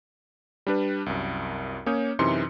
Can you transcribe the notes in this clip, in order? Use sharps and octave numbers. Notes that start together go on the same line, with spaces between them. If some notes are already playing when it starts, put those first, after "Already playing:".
G3 D4 B4
C2 F#2
A#3 C#4 C#5 D#6 G6
F#2 C3 E3 D#4 C6 C#7